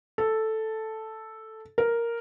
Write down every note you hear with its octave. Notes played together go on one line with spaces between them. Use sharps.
A4
A#4